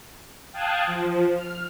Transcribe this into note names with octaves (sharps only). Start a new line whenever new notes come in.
F5 G5 A5 D#6 F#6 G#6
F3
F6